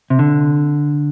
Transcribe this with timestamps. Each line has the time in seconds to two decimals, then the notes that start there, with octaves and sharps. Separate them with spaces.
0.10 C3
0.19 D3